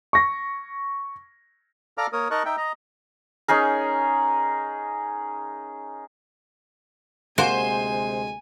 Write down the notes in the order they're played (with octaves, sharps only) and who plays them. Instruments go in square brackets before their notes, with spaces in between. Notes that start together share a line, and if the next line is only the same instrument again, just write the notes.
[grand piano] C#6 A#6
[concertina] A4 D5 F5 A#5 D6 F6
A#3 A#4 C#5 D#6
D#4 A#4 D#5 A5 C#6 F#6
D#4 E5 G5
D#5 A#5
[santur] C#4 D#4 G#4 A#4
[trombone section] D2 C3 G#3 [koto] A#3 F#4 A#4 [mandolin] C5 [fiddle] G#5